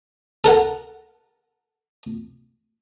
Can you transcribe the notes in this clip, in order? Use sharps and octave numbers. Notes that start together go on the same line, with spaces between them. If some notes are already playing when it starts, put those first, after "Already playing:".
A4 A#4 F#5